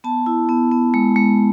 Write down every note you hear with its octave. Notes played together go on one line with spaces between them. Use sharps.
B3 A5
E4
B3
B3
G#3
G#3